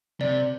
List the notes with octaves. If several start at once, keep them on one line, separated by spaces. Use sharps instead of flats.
C3 D5